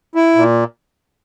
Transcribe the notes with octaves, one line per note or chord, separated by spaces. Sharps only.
E4
A#2